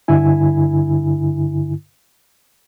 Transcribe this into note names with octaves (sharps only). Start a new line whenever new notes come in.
G2 D3 E4 G#5